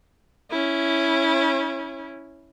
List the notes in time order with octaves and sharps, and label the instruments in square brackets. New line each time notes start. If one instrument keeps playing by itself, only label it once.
[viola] C#4 E4